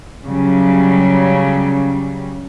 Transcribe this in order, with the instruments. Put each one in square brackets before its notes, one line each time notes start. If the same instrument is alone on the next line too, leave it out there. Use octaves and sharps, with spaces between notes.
[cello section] C#3 F#3 G3